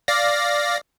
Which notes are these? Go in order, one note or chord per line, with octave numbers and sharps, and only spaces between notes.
D5 F5 A#6